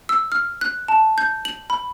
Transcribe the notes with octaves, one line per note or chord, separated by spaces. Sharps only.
E6
F6
F#6
A5
G6
F#7
B5